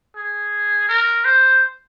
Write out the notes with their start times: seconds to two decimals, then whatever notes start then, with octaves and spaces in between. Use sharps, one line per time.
0.16 G#4
0.89 A#4
1.25 C5